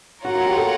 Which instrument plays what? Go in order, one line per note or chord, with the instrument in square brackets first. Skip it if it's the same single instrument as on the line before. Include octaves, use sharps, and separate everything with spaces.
[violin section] F4 A#4 C#5 F#5 [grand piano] F#4
[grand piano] F#4
G4
A4